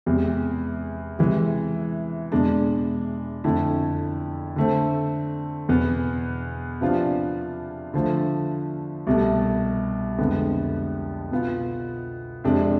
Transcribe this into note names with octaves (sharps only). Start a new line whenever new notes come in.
E2 C3 G#3
C3 E3 G#3
E2 B2 G#3 D4
F2 D3 A3 E4
D3 A3 C4
E2 B2 B3
C3 F3 B3 D4 F4
D3 F3 A3
C2 B2 A3
F2 D3 G#3 B3
B2 B3 F4
F2 C3 G#3 D4